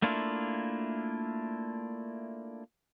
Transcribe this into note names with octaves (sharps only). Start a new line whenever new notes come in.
A3 A#3 D4 E4 F4